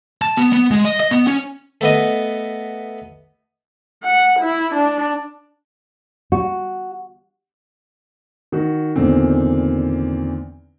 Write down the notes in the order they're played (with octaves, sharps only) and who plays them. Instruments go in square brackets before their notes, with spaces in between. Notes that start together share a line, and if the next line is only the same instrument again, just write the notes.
[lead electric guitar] A5
B3
B3
G#3
D#5
D#5
B3
C#4
[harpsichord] A3 B3 D#5
[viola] F#5
E4
D4
[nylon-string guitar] F#4
[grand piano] D#3 F#4
E2 A#2 D3 D#3 C4